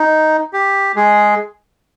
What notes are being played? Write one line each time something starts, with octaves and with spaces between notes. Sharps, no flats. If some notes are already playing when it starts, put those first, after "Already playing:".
Already playing: D#4
G4
G#3 G#4